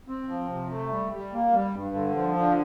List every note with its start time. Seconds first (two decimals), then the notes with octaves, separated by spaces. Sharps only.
0.08 C4
0.29 F3
0.50 C3
0.70 A3
0.91 G3
1.12 G3
1.33 A#3
1.53 G3
1.74 G2
1.95 D3
2.15 F3
2.36 D3